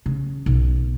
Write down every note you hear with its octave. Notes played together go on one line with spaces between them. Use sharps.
C#3
B1